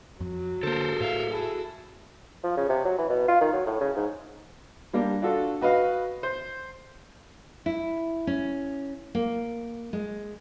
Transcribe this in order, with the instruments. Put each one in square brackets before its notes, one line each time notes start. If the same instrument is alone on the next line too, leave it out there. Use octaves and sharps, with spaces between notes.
[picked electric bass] F2 [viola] F#3
[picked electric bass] D3 A#3 [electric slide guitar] A4 A#4 [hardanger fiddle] C5
[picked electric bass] A2 [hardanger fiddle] E5 F5
[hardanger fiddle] E4 A4 [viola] F#4 G#4
[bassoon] F3
C#3
C3
F#3
E3
B2
F4
D#3
F#3
A2
C#3
G#2
[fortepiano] G3 A#3 D4 G4
D4 F4 F#4 A4
F#4 B4 D#5 F5
C5
[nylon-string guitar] E4
C#4
A#3
G#3